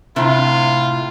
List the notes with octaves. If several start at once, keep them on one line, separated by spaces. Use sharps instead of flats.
A2 C3 F4